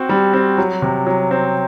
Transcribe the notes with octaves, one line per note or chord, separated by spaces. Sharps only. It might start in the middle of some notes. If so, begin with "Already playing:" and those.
Already playing: C4 F#4
G3
C4
F#3
C3
F#3
C4